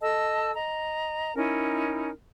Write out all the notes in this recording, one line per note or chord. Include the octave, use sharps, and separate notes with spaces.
A4 D#5 A5 E6
D#5 A#5
C#4 D#4 E4 A#4